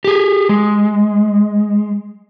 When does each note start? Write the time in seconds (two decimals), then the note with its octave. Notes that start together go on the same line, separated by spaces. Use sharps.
0.04 G4 G#4
0.49 G#3